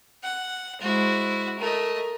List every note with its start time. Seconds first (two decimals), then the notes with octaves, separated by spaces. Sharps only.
0.23 F#5
0.81 G#3 E4 F#4 C5
1.59 A3 A#4 D#5